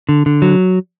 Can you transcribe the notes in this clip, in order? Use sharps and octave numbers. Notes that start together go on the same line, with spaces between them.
D3
D3
F#3